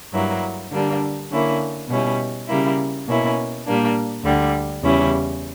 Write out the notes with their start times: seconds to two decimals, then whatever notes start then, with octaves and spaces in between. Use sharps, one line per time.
0.13 G2 F#3 A#3 E4
0.71 D3 G3 A#3 D4
1.30 D3 A#3 C#4 E4
1.89 B2 G3 C#4 E4
2.48 C#3 G3 A#3 E4
3.07 B2 A#3 C#4 E4
3.65 A#2 G3 A#3 D4
4.24 D2 D3 G3
4.83 E2 C#3 G3 C#4 E4